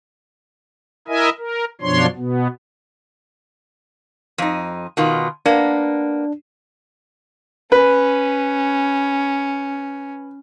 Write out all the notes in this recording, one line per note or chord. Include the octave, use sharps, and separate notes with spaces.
E4 A#4 D#5 E5 G#5
A#4
F#2 B2 F3 D4 C#5 C6
B2 B3
F2 D#4
B2 D#3 F4
A#3 B3 D4
C#4 B4